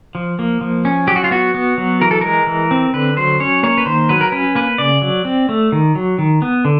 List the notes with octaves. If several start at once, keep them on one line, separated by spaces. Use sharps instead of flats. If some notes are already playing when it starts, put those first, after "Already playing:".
F3
A#3
F3
C#4
F#3 G4
F#4
F4
B3 F#4
B3
F#3
E3 A#4
A4
G#3 A#4
E3
C4
D3 B4
F#3 C5
C#4 C#5
A#3 C#5
B4
D#3 C5
F#3 B4
A#4
C#4 B4
A#3 B4
C#3 D5
F#3
C4
A3
D#3
F#3
D#3
B3
D3